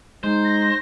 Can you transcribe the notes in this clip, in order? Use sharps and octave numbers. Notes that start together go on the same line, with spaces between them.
G#3 D#4 C5
A#6